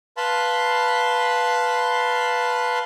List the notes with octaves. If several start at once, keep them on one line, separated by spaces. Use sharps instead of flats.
B4 F5 A5 B5 C6